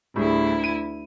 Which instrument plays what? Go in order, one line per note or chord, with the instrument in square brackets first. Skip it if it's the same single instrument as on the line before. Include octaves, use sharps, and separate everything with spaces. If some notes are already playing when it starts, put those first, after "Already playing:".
[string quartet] D2 E4 [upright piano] A2 G3 G#4
[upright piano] D#7